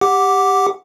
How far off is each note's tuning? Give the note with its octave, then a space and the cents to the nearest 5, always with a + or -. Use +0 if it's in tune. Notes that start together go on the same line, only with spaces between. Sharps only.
G4 +10 F#5 +0 D6 -5